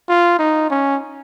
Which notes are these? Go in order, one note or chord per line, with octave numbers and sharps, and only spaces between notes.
F4
D#4
C#4